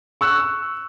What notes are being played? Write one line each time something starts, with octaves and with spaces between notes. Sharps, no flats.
C#6 E6 F#6